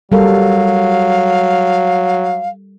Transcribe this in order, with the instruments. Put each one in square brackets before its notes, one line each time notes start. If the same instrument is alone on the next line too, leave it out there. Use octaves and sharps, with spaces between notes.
[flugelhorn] F#3 [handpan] G3 A4 A#4 [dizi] F5